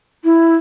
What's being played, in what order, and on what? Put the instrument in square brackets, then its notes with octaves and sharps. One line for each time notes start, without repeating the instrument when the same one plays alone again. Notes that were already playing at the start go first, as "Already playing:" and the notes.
[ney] E4